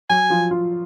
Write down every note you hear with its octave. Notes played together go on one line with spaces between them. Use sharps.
F#3 F#4 G#5
F3 F4
F3 F4